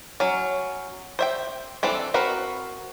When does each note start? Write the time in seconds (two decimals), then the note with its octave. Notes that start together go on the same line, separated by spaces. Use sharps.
0.20 F#3 C#4
1.19 C5 E5 G5
1.83 E3 C4 D4 A4
2.14 C4 F#4 A#4 B4